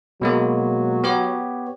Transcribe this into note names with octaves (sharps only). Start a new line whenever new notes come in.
B2 F#3 G#3 A#3
B3 G4 C#5